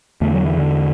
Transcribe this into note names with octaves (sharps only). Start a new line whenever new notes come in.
E2 D3 A3
F#3
E3
D3